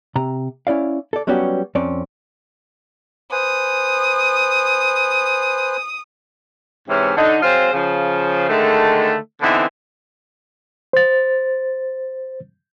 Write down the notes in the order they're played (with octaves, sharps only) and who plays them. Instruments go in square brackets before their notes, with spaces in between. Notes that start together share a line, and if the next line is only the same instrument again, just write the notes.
[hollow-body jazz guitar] C3 A#5
C#4 E4 D5 F5
A4 D5
F#3 G3 B3 C#4 F#4 G4
F2 C4 C#4 D5
[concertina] B4 C5 G#5 [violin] D#6
[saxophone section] G#2 C3 E3 C#4
D3 D#4
F#3 G#3 C4 F4 C5
C#3 F3
D3 D#3 G#3 A3
D3 E3 B3 C4 D#4 E4
[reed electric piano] C5 A6